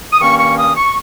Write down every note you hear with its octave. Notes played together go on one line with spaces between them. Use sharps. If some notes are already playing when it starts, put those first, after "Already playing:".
D#6
G2 D#3 A#3 C#4 C#6
C#6
D#6
C#6